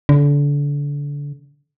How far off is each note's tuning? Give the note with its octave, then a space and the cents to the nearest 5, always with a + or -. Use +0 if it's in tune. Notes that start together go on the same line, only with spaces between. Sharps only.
D3 -30